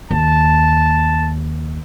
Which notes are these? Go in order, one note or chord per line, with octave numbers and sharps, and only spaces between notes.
D#2 A5